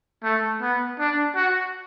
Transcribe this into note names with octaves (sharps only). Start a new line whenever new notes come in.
A3
B3
D4
F#4